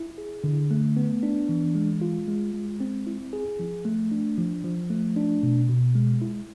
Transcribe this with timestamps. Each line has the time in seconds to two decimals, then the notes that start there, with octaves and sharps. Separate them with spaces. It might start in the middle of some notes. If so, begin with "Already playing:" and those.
Already playing: E4
0.18 G#4
0.44 D3
0.71 A3
0.97 B3
1.23 D4
1.49 E3
1.75 G#3
2.02 F4
2.28 G#3
2.54 G#3
2.80 C4
3.07 E4
3.33 G#4
3.59 F3
3.85 A3
4.12 D4
4.38 F3
4.64 F3
4.90 A3
5.16 D4
5.43 B2
5.69 B2
5.95 G#3
6.22 E4